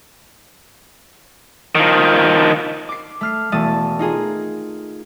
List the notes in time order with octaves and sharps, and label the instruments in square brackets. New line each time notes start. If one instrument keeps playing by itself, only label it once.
[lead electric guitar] D#3 F3
[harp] D6 C7
A3 F6 C7
E1 A3 A5 D#6
D#4 F4 G#4 A#4